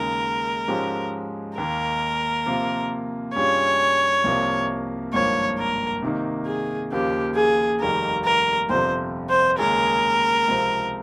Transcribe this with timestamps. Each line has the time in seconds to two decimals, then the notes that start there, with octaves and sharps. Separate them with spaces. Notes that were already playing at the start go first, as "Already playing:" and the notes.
Already playing: D#2 C#3 G#3 D#4 A#4
0.68 G#2 F3 G#3 C#4 G4
1.57 D#2 D#3 A#3 A#4
2.46 C3 F3 A#3 F4
3.36 G2 G3 C#4 F4 G#4 C#5
4.24 C2 C3 F3 A#3
5.14 G#1 G2 F3 A#3 C#5
5.58 A#4
6.02 C3 D#3 A#3 D#4
6.47 G#4
6.92 D#2 C#3 F3 A#3 G4
7.36 G#4
7.80 F1 D#2 D#3 G3 A#3 A#4
8.25 A#4
8.69 G1 F2 C3 F3 C5
9.30 C5
9.59 D#2 C#3 G#3 C#4 G#4 A#4
10.48 C#2 C3 F3 C4